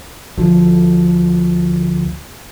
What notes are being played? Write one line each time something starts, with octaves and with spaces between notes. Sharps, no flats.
D2 D3 F3